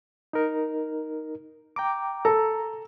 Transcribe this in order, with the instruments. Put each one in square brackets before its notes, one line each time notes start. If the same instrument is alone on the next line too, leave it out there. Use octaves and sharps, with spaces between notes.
[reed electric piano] D#4 A#4
G5 A#5 D6
[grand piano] A4 [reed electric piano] A#5